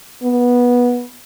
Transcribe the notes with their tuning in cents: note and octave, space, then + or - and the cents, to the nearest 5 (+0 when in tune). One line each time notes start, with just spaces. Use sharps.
B3 -15